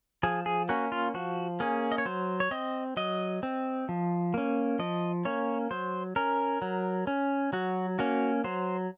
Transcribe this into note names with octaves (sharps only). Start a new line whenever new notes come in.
F3 G#4
G#4
A#3 C#4 F#4
F4
F3 F#4
A#3 C#4 G#4
D#5
C#5
F#3 C5
C#5
C4 D#5
F#3 D#5
C4
F3
A#3 C#4
F3 D#5
A#3 C#4 C#5
F#3 C5
C#4 A#4
F#3
C#4
F#3 F#4
A#3 C#4 F#4
F#3 C5